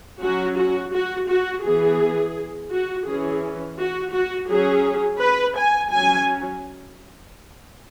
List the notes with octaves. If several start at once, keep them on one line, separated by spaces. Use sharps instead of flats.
F#3 C#4 F#4
F#4
F#4
F#4
E3 B3 G#4
F#4
E3 C#4 G#4
F#4
F#4
F#3 C#4 G#4
B4
G#5
F#3 C#4 G#5